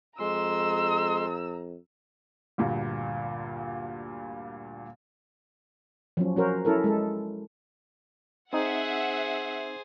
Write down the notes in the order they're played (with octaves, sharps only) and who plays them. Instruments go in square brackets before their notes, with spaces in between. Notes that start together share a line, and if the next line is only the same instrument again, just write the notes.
[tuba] F2 [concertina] G#3 C6 [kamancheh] A#5 E6
[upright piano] D2 G2 A#2
[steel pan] F3 F#3 C#4
C#4 F#4 A#4 C5
C#4 E4 A4 A#4
G#3 A4
[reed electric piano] C4 D#4 [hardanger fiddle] G#4 C5 [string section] E5 F#5